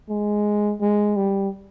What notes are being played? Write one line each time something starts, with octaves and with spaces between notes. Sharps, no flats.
G#3
G#3
G3